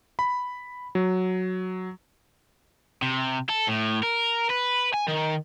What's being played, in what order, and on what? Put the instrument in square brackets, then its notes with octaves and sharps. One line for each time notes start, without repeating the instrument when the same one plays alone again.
[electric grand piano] B5
F#3
[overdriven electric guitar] C3
A4
A2
A#4
B4
G#5
D#3